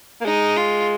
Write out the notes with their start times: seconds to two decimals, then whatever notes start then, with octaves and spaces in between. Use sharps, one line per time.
0.21 A#3
0.25 G#3 D#4
0.56 F4